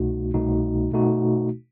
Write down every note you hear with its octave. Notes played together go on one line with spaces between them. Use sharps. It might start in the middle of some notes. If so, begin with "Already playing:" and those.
Already playing: C2 B2 A3 D#4 F#4
C2 B2 A3 D#4 F#4
B2 A3 D#4 F#4